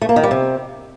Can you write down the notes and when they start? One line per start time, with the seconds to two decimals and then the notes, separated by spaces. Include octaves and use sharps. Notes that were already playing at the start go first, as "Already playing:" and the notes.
0.02 A3
0.09 A#3
0.16 D#3
0.24 G3
0.31 C3